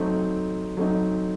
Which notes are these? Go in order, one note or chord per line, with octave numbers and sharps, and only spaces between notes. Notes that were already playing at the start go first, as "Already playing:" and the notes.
Already playing: F#3 A3 C4 D#4
F#3 A3 C4 D#4